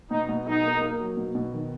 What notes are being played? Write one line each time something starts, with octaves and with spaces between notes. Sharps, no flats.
B2 D#4
B2
B1 D#4
A#3
A#3
F#3
B2
B2
D#3